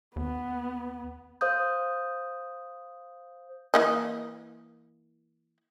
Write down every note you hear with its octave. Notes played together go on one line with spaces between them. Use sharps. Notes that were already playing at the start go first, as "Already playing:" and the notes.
D#2 B3
C5 F5 D#6 G6
E3 A#3 D#5